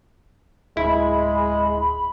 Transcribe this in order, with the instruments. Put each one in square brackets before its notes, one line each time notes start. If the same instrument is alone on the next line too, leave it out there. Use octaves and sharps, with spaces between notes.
[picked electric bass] D1 [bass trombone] G#3 [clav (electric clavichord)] E4 [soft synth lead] B5